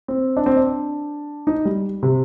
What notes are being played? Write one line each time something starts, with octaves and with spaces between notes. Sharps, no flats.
C4
D4
C4
D4
D#4
G3
C3